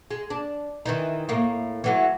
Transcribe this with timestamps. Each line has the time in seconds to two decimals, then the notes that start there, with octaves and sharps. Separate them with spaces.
0.11 G#3
0.30 D4
0.86 D#3 E3 D#4
1.29 A2 A#3
1.84 E3 F#3 A3